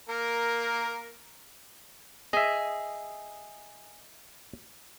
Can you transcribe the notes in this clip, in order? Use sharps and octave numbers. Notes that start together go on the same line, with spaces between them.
A#3 A#4
G#4 D#5 E5